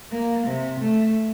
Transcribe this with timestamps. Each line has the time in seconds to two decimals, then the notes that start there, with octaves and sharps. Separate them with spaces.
0.12 A#3
0.47 C3
0.80 A3